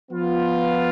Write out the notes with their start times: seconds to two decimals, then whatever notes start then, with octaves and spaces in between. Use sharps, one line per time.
0.11 F3 B3 F4